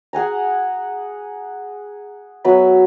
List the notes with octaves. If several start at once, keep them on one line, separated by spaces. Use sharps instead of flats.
G#4 F#5 G#5 A#5
F#3 B3 E5 B5